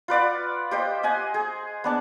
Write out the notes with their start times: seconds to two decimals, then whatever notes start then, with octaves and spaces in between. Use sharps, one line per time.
0.08 F4 B4 D5 F#5
0.71 G4 C5 D#5
1.03 D#5 F#5 G#5
1.34 G#4
1.84 B3 D4 A5